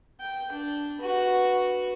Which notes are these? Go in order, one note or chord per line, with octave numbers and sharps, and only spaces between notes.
G5
D4
F#4 B4